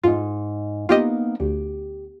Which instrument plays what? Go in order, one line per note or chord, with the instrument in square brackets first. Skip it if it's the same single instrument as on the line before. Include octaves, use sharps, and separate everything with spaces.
[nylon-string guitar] G#2 D#4 [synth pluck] F4
[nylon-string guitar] A#3 B3 D#4 [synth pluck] F4 G4 D#5
[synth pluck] D2 [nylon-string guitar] G4